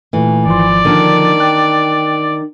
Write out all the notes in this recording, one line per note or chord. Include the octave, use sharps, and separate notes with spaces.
A#2 E3 A3
G#1 F3 D5 C6
D3 D#3 F3 G3 A#3 D4
G5 F#6